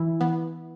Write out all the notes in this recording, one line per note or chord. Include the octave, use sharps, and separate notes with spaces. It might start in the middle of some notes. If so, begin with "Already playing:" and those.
Already playing: E3 E4
E3 B3